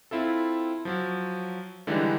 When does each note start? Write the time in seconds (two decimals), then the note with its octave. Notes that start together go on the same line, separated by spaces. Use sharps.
0.11 C4 E4 F4 A4
0.85 F3 F#3
1.87 D3 E3 G3 G#3 D4 D#4